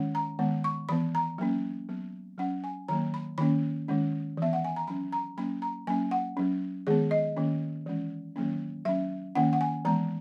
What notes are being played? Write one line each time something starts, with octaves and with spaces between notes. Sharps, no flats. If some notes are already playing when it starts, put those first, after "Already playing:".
Already playing: D#3 G#3 C#4
A#5
D#3 G#3 B3
C#6
E3 B3 B5
A#5
F#3 A#3 C#4
F#3 B3
F#3 C#4 F#5
G#5
D#3 F#3 A#3 A#5
B5
D#3 A#3 C#4 B5
D#3 G#3 C#4
E3 B3 E5
F#5
G#5
A#5
F#3 C#4 B5
A#5
F#3 A#3 C#4 B5
A#5
F#3 A#3 C#4 G#5
F#5
F#3 C#4
D#3 G#3 B3 G#4
D#5
D#3 A#3 C#4
E3 G#3 C#4
D#3 F#3 A#3 C#4
F#3 C#4 E5
D#3 A#3 C#4 F#5
F#5
G#5
E3 G#3 B3 A#5